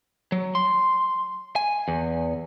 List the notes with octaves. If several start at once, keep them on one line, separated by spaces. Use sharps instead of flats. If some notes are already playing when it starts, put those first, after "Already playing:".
F#3
C6
G#5
E2